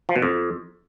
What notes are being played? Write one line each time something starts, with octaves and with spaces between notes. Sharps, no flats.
F3
B2
F2